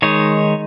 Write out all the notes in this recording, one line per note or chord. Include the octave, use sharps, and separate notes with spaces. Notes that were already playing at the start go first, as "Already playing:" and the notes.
D#3 G#3 D#4 C#5